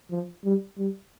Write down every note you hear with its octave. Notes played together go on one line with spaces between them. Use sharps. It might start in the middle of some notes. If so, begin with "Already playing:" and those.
F3
G3
G3